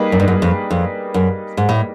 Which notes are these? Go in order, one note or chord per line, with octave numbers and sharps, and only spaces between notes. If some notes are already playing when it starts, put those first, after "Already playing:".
Already playing: G3 A#3 D#4 G#4 B4
F#2
G2
F#2
F2
F2
F#2
G#2
A2